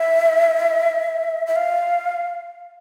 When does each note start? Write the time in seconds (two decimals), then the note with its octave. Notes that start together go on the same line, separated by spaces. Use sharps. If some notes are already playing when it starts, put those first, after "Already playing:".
Already playing: E5
1.47 E5
1.56 F5